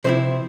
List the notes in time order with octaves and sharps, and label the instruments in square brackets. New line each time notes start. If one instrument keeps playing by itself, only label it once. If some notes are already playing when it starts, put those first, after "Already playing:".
[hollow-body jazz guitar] C3 F3 C4 E4 C5